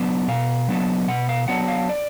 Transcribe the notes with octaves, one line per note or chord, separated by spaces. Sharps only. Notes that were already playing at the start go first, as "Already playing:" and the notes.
Already playing: F#3 B3 D4
B2 F5
F#3 B3 D4
B2 F#5
F5
F#3 B3 D4 F#5
F5
D5